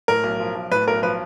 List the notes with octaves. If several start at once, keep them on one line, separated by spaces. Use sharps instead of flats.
A2 A#4
B1
F3
B1
A2 B4
B1 A#4
F3 B4